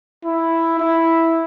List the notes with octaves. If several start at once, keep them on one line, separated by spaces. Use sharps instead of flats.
E4
E4